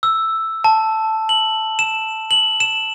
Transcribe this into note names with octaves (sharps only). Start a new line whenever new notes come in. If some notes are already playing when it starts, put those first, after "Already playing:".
E6
A5
F#7
E7
F#7
E7